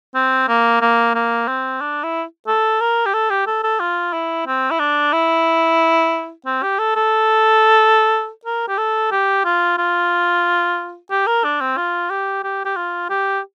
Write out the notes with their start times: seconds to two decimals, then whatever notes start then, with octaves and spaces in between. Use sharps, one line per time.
0.15 C4
0.48 A#3
0.81 A#3
1.15 A#3
1.48 C4
1.81 D4
2.03 E4
2.47 A4
2.81 A#4
3.06 G4
3.14 A4
3.30 G4
3.47 A4
3.63 A4
3.80 F4
4.13 E4
4.47 C4
4.70 E4
4.79 D4
5.13 E4
6.46 C4
6.63 G4
6.79 A4
6.95 A4
8.45 A#4
8.68 G4
8.78 A4
9.11 G4
9.45 F4
9.78 F4
11.11 G4
11.27 A#4
11.44 D4
11.61 C4
11.77 F4
12.10 G4
12.43 G4
12.65 G4
12.76 F4
13.10 G4